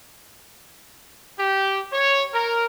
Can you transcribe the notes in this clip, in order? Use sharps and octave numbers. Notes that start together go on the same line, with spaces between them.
G4
C#5
A#4